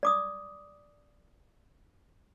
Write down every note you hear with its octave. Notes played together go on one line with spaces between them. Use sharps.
D5 D6 D#6